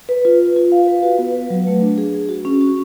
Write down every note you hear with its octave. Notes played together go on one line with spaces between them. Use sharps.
B4
F4
B4
F4
F5
B4
F#4
B3
B4
F#3
A3
D4
G#4
G#4
F#4
C#4
F#4